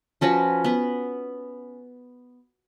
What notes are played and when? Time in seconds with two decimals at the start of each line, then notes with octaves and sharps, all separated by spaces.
0.21 F3 C#4 F#4 B4
0.64 B3 B4